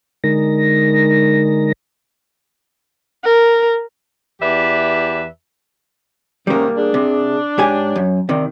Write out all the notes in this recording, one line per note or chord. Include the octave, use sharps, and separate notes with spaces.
D3 G#3 D#4 A#4 A#6
A#4
E2 G4 B4 D5 E5
G#2 C3 D#3 G3 A#3 C#4
D4 G#4
C3
G#2 G4 C#5 G#5
F#2
C3 D#3 D5